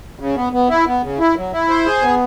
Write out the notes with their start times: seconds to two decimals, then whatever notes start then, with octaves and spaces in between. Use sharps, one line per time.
0.20 C#3
0.36 B3
0.53 B3
0.69 E4
0.86 B3
1.03 C#3
1.19 E4
1.36 F#3
1.53 E4
1.69 C5
1.86 G#4
2.02 B3